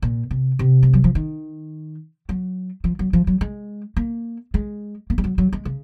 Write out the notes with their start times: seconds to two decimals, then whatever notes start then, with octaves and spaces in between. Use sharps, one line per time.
0.02 A#2
0.31 C3
0.59 C3
0.83 G#3
0.93 F#3
1.04 F3
1.15 D#3
2.29 F#3
2.84 F3
2.99 F#3
3.13 F3
3.27 F#3
3.41 G#3
3.96 A#3
4.54 G#3
5.10 A#3
5.18 G#3
5.24 F#3
5.38 F#3
5.53 G#3
5.65 C#3